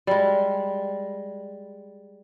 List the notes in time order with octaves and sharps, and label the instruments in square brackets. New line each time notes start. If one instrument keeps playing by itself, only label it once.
[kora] G3 G#3